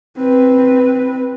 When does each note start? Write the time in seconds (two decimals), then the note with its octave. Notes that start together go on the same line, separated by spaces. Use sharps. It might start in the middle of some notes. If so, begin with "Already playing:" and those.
0.17 C4 B4